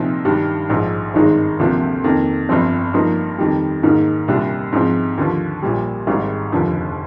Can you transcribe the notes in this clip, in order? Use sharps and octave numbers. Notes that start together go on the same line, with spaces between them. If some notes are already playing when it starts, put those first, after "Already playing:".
Already playing: C2 A#2 F3 C4 D#4
G2 D#3 G3 D4
A#1 G#2 F3
G#1 G2 D#3 G#3 D#4
D2 C3 F3 A#3 D4
F2 D#3 A#3
G1 G2 F3 C4
G2 F3 A#3 D#4
F2 D#3 G3
G#2 D#3 A#3 D#4
C2 A#2 G3 D4
G#2 F3 C4
D#2 D3 F3
A#1 A#2 G3
G#1 G#2 G3
F1 D#2 D3 F3